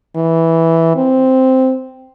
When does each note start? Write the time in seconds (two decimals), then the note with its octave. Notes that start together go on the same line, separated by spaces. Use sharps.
0.16 E3
0.96 C4